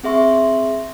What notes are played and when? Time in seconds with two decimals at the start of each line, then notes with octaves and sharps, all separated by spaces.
0.03 C4 G#4 E5 C6 C#6